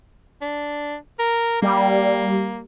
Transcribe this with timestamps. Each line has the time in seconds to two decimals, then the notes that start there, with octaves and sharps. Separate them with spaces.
0.42 D4
1.19 A#4
1.62 G3 A#3